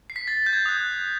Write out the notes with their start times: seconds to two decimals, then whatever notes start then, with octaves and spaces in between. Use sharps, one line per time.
0.10 C7
0.16 B6
0.27 A6
0.46 G6
0.53 G#6
0.66 D#6 F#6